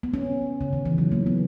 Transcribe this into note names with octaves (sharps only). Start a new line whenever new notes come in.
B3
C#4
C#3
D#3
E3
F#3
A#3
B3